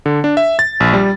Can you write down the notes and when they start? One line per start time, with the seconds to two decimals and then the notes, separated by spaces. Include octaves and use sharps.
0.06 D3
0.24 D4
0.37 E5
0.59 A6
0.80 A#1
0.93 G3